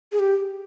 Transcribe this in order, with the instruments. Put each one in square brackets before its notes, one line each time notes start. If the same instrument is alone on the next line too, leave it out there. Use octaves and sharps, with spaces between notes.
[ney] G#4
G4